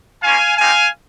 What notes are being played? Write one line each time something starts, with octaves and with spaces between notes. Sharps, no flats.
A#3 C#4 F4 F5 G#5
C4 D#4 G4 F5 G#5